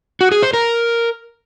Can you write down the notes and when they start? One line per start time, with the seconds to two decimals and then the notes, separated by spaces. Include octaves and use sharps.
0.21 F#4
0.32 G#4
0.43 C5
0.53 A#4